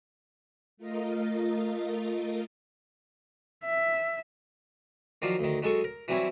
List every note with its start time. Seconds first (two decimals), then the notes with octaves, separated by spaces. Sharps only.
0.77 A3 F4 A#4 D#5 F5
3.65 E5
5.22 D#3 F3 F#3 D5 F5
5.39 D2 D#3
5.63 F#3 G#3 A4 C#6 D#6
5.84 A#4
6.08 E3 F#3 G3 C4 E4 C#5